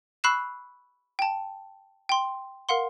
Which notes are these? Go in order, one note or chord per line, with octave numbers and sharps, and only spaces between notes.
B5 C#6 E6 F#6 C7 E7
G5 A5
G5 C6
A#4 F5 F#5 C6